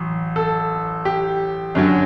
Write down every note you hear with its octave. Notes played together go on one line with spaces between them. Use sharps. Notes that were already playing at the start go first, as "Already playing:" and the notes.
Already playing: A1 F#3
A4
G4
F#2 D3 F#3